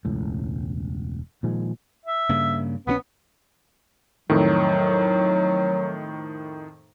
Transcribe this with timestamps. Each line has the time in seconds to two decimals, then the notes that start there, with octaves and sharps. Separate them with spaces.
0.05 E1 C#2 A2
1.43 A#2 D#3 F3 G#3
2.06 E5
2.29 G2 C#3 A#3
2.87 A#1 F3 B3 C#4
4.30 F2 A2 D#3 F#3